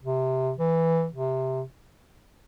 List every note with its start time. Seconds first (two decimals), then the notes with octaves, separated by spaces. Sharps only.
0.03 C3
0.58 E3
1.13 C3